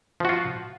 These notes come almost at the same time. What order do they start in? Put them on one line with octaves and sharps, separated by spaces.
F3 F#4 F4